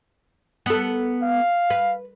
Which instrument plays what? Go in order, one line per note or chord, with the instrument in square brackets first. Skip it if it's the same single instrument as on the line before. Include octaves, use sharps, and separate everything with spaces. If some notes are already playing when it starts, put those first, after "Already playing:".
[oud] B3 A4
[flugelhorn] F5
[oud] B4